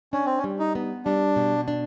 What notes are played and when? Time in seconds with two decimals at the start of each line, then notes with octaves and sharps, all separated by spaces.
0.13 C#4 D4
0.26 C4
0.38 C#4
0.44 G3
0.59 D#4
0.75 B3
1.05 G3 D4
1.36 B2
1.68 D4